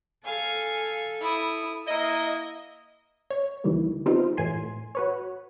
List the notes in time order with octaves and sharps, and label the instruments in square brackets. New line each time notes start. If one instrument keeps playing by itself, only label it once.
[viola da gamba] A4 [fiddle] F5 G#5
[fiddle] E4 D#6
[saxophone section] A#3 E4 D#5
[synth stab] C#5
D2 D#3 E3 G3 A#3
G3 A3 B3 C4 D#4 F4
A2 E3 G#5 C6
F#4 B4 C#5